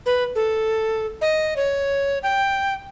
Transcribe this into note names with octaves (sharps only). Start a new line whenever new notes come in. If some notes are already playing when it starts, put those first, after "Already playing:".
B4
A4
D#5
C#5
G5